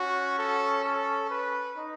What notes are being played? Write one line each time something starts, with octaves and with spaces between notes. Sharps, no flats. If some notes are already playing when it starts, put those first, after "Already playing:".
Already playing: C#4 F#4
A4
A4
B4
D#4